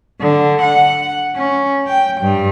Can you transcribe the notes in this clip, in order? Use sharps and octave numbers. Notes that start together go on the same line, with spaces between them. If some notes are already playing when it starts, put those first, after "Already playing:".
D3
F#5
C#4
G5
G2